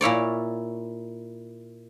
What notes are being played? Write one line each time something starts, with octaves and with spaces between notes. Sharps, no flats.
A#2 E4 C#5 D5